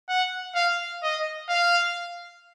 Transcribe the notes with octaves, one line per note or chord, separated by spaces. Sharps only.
F#5
F5
D#5
F5